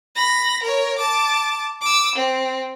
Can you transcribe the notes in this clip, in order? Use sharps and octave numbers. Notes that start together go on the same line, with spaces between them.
B5 A#6
A#4 C#5
A5 D6
D6 E6
C4